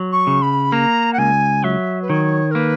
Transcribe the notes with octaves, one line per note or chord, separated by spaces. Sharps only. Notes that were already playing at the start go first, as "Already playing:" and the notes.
Already playing: F#3
C#6
C#3
B5
A#3 A#5
F#5
C#2 G#5
F#3 E5
B4
D#3 C#5
A#4
A#3 B4